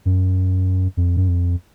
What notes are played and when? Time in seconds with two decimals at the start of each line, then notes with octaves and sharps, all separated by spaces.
0.05 F#2
0.97 F2
1.17 F#2
1.28 F2